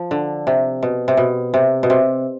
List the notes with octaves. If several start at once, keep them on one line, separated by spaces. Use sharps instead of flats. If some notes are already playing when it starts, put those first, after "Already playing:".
Already playing: F3
D3
C3
B2
C3
B2
C3
B2
C3